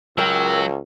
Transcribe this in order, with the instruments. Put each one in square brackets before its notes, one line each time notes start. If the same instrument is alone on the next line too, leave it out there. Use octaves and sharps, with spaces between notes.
[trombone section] C#2 [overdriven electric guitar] F#3 [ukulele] A#4 G5 [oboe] E6